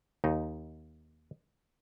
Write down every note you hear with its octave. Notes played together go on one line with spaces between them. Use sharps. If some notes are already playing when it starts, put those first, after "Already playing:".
D#2 D#4